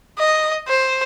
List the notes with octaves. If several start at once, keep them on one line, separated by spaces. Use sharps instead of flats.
D#5
C5